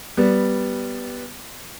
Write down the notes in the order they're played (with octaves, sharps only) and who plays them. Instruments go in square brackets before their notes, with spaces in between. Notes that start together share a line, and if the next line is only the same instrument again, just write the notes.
[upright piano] G3 B3